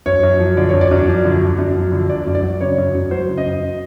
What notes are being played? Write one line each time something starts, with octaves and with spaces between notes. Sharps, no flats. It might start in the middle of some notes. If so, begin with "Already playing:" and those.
F#2 C#5
F#2
F3
D3 D5
F#2 C#5
D5
F#2
F3
D3
F#2
F#2
F3
D3
F#2 D5
F#2
D5
F#3
C#3 C#5
F#2
F#2
F#3 C5
C#3
D#5
F#2